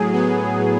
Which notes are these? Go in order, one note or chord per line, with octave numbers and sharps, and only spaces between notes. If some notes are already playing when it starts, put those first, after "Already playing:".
Already playing: A2 F#3 G#4
B3